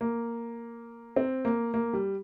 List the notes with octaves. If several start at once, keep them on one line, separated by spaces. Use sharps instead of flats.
A#3
C4
A#3
A#3
G3